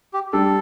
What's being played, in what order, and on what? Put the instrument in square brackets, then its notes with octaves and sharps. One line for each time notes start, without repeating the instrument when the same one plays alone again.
[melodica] G4
[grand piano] G3 D4 G4 [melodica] A4